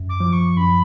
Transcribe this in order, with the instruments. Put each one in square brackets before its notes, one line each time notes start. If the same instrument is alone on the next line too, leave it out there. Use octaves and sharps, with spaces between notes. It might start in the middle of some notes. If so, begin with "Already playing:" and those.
Already playing: [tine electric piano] F#2
[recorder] D6
[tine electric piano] F3
[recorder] C#6
[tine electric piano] F#2 [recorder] B5